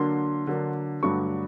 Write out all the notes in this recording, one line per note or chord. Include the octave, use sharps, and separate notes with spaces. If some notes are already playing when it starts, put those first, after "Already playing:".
Already playing: D3 F#3 A#3 D4 C6
D3 F#3 A#3 D4
G2 D3 F#3 A3 D4 C#6